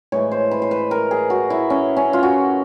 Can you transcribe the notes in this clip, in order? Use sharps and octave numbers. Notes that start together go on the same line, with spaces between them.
A2 E3 G#3 C#5
C5
B4
C5
B4
A#4
G#4
F#4
E4
C#4
C#4
F4
F#4